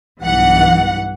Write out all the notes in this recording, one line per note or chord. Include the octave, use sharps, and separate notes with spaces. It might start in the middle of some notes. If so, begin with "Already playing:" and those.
B1 G2 E3 F#5